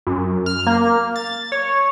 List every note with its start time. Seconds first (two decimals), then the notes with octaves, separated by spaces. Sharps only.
0.07 F#2
0.46 F6
0.67 A#3
1.16 A6
1.52 C#5